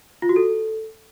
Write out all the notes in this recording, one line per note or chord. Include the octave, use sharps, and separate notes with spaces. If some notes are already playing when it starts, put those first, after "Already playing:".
F4
F#4
A4